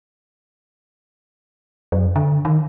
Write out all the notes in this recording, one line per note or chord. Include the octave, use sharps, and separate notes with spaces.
F#2
D3
D#3